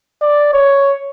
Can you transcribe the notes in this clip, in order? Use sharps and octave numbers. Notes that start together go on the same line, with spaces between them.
D5
C#5